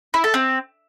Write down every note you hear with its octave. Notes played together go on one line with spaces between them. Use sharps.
E4
A4
C4